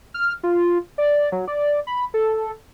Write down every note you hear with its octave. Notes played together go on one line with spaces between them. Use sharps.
F6
F4
D5
F#3
D5
B5
A4